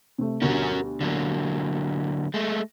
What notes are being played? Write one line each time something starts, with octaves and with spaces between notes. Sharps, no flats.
C3 A3
D2 B2 G3 C#4 F#4 A#4
D3 F#3 A#3
G#3 A3